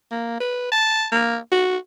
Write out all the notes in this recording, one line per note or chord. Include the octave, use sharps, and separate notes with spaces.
A#3
B4
A5
A#3
F#4